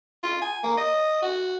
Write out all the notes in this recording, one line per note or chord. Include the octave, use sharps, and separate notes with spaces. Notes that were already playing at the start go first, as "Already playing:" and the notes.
F4
G#5
A#3
D#5
F#4